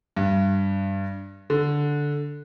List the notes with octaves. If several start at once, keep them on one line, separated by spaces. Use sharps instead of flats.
G2
D3